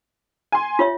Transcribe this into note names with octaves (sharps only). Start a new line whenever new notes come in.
G#5 C6
F4 C#5 E5